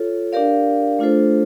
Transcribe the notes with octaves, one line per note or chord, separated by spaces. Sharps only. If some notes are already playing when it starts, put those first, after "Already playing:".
Already playing: F4 A4 C#5
D4 G4 A#4 D5 F5
A3 D4 F4 A4 C5